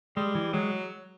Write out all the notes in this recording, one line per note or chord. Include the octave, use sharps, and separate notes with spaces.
G3 G#3
E3
F#3 G#3